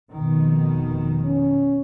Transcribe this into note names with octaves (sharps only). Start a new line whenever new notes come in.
F1 B2 D#3
C#4